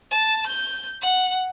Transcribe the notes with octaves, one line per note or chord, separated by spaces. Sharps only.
A5
G6
F#5